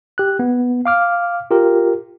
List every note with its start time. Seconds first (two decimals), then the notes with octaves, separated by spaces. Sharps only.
0.18 G4 F#6
0.39 B3
0.85 F5 D6 F6
1.51 F4 G4 A#4